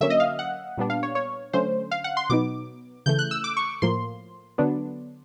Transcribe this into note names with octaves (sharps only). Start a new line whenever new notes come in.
D3 F#3 A#3 C#4 E5
D#5
F5
F#5
A#2 G3 B3 D4
F5
C#5
C#5
D3 F#3 A3 C#4 C5
F5
F#5
C6
B2 F#3 B3 D#4 D6
C#3 E3 A3 G6
F#6
E6
D6
C#6
A2 F3 A#3 C6
D3 F#3 B3 D4